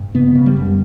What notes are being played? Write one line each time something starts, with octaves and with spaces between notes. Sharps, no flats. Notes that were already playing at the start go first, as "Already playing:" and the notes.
Already playing: G2
C#3 B3
C#3
G3
F#2